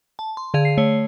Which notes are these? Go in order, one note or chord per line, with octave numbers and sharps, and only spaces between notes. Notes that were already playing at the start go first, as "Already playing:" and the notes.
A5
C6
D3 G#4 F5 G#6
C7
A3 C#5